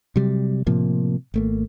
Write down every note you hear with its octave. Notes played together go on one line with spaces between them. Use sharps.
C3 F#3 G3
A2 C3 F3 A#3
G#1 A3 A#3